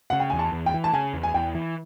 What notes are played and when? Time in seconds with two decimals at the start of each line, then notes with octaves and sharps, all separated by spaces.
0.10 C#3 F#5
0.20 G5
0.30 E2 G#5
0.39 A5
0.53 E2
0.66 G5
0.74 E3
0.84 A5
0.93 C#3 G#5
1.14 E2
1.23 G#5
1.34 E2 G5
1.55 E3